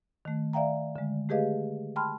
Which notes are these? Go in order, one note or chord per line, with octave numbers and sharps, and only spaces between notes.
D#3 A3
D5 E5 F5 G5 A#5
D3 G#3
A3 G4 G#4 B4 D#5 F5
G5 A5 B5 C6 F6